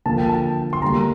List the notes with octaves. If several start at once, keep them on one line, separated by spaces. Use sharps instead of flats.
D3 F3 A#3 A5
G5
A5
C6
D3 G3 A#3 A#5